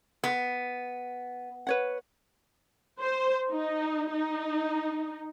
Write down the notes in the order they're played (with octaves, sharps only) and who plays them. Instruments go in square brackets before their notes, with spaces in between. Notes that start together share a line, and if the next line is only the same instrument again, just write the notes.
[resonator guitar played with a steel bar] B3
[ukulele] B4 C#5 F#5
[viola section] C5
D#4
D#4